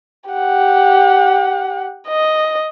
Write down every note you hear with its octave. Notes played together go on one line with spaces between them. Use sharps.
G4 F#5
D#5